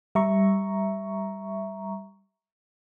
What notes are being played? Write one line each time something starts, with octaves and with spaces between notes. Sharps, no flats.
G3 E5 A#5 C#6